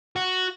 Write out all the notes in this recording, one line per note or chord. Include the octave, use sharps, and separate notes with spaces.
F#4